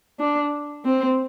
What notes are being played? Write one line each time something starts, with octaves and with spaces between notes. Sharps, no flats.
D4
C4